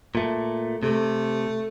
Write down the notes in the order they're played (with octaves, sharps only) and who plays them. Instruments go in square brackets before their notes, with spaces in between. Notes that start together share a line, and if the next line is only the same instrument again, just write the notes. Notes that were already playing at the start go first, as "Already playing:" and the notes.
[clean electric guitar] A#2 A3
[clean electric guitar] C3 [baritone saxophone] A3